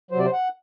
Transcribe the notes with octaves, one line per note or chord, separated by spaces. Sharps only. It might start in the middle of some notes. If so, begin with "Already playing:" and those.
C3 F#3 C5 D5
C5
F#5